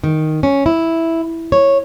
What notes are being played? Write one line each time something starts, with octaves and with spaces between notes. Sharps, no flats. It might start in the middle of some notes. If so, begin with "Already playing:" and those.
D#3
C#4
E4
C#5